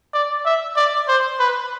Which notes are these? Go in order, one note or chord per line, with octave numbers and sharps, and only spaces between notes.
D5
E5
D5
C5
B4